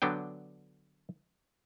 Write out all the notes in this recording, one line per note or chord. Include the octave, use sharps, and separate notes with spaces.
D3 F#3 B3 D4 G5